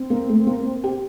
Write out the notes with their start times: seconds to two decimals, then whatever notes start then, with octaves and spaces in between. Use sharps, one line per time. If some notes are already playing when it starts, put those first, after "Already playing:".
Already playing: C4
0.10 A#3
0.29 A3
0.47 A#3
0.83 G4